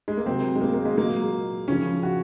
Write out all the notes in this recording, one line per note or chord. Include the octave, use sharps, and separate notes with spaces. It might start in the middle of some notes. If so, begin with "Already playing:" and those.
G#3
A#3
C3 F#3 C4
G#3
A#3
A#3
G#3
A#2 F#3 A#3
C#3 F3 C#4
F#4